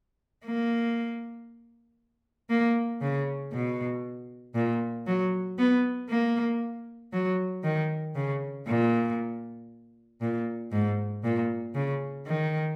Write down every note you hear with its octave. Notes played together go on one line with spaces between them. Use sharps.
A#3
A#3
C#3
B2
A#2
F#3
B3
A#3
F#3
D#3
C#3
A#2
A#2
G#2
A#2
C#3
D#3